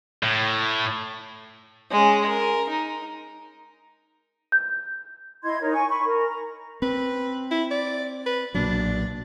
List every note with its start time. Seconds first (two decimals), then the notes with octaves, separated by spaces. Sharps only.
0.23 A2
1.91 G#3 C#4
2.28 A#4
2.69 D#4
4.52 G6
5.44 E4 D#5 C6 G#6
5.60 D#4 A#4 C#5
5.72 G#5 C#6
5.89 B5 C#6
6.05 A#4
6.27 A#5
6.82 C4 B4
7.51 E4
7.71 D5
8.26 B4
8.55 B1 A#2 F#3 D4